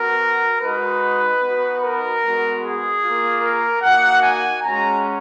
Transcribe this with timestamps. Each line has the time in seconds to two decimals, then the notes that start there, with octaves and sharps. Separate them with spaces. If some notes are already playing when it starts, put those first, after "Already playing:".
Already playing: B3 F#4 A#4
0.62 G#3 D#4 F#4 B4
1.42 B3 D#4 F#4
1.82 A#4
2.22 G#3 B3 F#4
2.63 G#4
3.03 A#3 F4
3.42 A#4
3.82 A#3 D#4 F#4 F#5
4.23 G#5
4.63 G#3 C#4 F#4 A#5